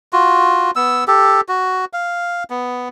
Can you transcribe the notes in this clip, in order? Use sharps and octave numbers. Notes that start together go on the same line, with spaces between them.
F4 F#4
B3 E6
G4 A4
F#4
F5
B3